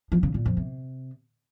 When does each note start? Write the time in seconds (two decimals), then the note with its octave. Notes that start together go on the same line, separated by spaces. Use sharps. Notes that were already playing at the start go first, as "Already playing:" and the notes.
0.12 F3
0.23 C#3
0.34 A#2
0.46 F2
0.57 C3